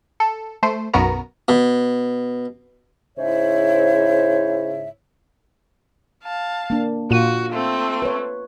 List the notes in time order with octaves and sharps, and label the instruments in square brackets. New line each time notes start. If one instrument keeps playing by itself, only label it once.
[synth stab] A4
A3 C5
B1 F#2 B3 F#4 A#4 A#5
[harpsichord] B2
[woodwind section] G#2 C#3 E4 C5 C#5 E5
[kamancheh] F5 A5
[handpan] A#3 D4
[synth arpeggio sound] A#2 D#7 [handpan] F4 [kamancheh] F#4
[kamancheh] A3 C4
[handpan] B4 C#5